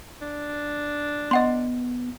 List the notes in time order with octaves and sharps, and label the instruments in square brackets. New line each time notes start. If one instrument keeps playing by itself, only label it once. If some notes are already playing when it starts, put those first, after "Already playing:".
[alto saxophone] D4
[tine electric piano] B3 [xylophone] D#5 F#5 C6